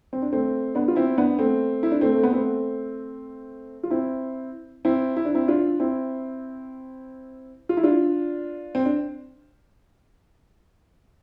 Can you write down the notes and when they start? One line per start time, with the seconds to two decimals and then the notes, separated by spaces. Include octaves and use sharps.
0.13 C4
0.22 D4
0.32 A3 C4
0.75 B3 D4
0.88 F4
0.96 C4 E4
1.18 B3 D4
1.39 A3 C4
1.83 E4
1.91 D4
2.01 A3 C4
2.14 A3
2.23 B3
2.33 A3 C4
3.83 F4
3.90 C4 E4
4.85 C4 E4
5.16 E4
5.25 D4
5.35 C4 E4
5.48 D4 F4
5.80 C4 E4
7.69 F4
7.77 E4
7.83 D4 F4
8.75 C4
8.85 D4